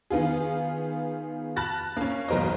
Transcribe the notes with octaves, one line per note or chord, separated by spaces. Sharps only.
D#3 B3 F4 G#4
A5 B5 F6 F#6 A6 A#6
A#3 C#4
B1 E2 A#4 C5 D#5